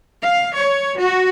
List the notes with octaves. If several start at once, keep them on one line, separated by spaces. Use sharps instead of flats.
F5
C#5
F#4